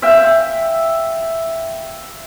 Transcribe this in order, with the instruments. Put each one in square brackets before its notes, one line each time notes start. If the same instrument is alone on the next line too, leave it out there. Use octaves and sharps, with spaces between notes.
[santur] E5 F5 G5